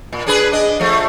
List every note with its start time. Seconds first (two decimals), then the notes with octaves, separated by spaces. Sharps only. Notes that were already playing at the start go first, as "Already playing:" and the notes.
0.13 A#2
0.26 D4 G#4 B4
0.52 D4 D#5
0.80 F3 A3